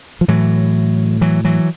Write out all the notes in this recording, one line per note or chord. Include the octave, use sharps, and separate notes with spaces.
F3
A2 E3 F#3
E3 F#3
E3 F#3